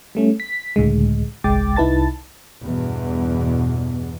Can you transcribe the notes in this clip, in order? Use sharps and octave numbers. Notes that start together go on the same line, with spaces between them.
G3 A3 C#4
B6
C#2 A2 D3 G#3
G1 C2 G#3 G5 D6 A6
C2 D#4 E4 B4 A5 A6
E2 G2 B2